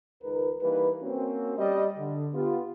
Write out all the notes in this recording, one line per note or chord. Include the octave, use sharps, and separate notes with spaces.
C#2 D#3 A#4 B4
E3 G3 A#3 D#4 B4
A#3 C4 C#4 F#4
G3 D#5
D3
B3 F4 G4